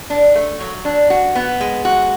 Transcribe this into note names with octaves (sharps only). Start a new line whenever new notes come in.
D4
A3
F#3
D4
F#4
B3
G#3
F#4